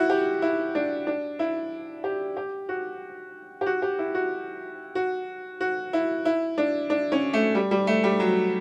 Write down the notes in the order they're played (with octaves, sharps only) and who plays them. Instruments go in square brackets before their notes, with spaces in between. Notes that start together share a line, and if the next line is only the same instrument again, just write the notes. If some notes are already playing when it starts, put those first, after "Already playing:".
Already playing: [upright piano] E4 F#4
G4
E4
D4
D4
E4
G4
G4
F#4
G4
F#4
G4
E4
F#4
F#4
F#4
E4
E4
D4
D4
C#4
A3
G3
G3
A3
G3
F#3